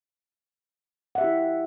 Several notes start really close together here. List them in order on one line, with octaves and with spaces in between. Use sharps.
F#5 E5 G4 E4